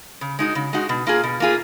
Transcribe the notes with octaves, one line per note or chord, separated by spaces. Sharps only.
C#3
G#3 D#4 F#4
C#3
G#3 D#4 F#4
B2
A#3 F4 G#4
B2
A#3 F4 G#4